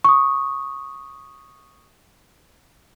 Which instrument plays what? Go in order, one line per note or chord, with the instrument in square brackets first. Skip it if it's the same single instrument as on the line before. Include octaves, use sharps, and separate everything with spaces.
[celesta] C#6 D#6